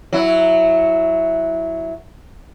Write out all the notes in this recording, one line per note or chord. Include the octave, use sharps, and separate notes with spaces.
F#3 E4